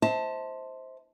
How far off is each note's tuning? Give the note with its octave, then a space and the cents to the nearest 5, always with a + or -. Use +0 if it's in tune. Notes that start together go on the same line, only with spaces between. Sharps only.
C5 +0 E5 -45 A5 +10